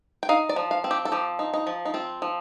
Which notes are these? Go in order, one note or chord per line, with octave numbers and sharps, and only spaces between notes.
G5
D#4 F5
D5
F3
F5
C4
G4
A4
F3 G4
D#4
D#4
F3
D#4
C4 F4
F3